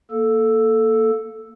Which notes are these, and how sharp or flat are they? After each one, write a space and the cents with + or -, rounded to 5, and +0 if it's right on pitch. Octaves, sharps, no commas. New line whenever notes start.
A#3 +0 A4 +0